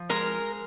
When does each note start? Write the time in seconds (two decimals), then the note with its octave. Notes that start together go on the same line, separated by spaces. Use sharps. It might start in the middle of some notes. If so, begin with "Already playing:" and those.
Already playing: F3
0.09 G#3 A#4